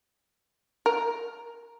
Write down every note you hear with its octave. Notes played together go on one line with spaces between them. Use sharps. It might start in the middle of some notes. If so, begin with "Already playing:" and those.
A#4